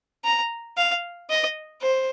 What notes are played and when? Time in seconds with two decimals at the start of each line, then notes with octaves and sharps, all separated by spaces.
0.25 A#5
0.77 F5
1.29 D#5
1.81 C5